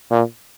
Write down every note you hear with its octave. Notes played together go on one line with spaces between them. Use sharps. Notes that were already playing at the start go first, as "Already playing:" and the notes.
A#2